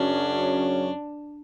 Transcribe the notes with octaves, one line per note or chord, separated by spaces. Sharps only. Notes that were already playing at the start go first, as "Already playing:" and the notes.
Already playing: F#2 C#3 F#3 C#4 D4